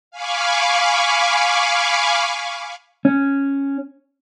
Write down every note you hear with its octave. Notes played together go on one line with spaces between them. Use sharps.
F5 G#5 B5 C#6 D6
C#4